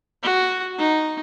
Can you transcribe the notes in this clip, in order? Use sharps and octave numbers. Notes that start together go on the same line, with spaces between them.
F#4
D#4